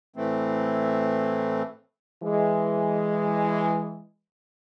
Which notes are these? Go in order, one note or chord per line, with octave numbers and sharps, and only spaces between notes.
A2 E3 A3 C4
E3 G#3